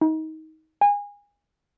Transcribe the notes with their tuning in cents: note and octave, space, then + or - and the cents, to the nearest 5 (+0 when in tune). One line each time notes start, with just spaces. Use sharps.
D#4 +25
G#5 -25